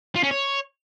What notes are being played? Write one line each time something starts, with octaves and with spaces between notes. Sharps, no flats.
F4
C#4
C#5